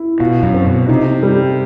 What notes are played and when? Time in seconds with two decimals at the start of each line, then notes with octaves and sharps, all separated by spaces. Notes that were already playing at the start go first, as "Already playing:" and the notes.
Already playing: E4
0.20 B2 F4
0.43 F#2
0.54 C4
0.66 B2
0.88 C3 D#4
1.23 G3